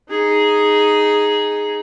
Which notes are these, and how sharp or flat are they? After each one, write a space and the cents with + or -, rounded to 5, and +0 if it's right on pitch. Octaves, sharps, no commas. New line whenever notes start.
D#4 +0 G#4 +0